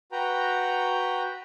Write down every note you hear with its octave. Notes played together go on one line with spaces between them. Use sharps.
F#4 B4 G5 A#5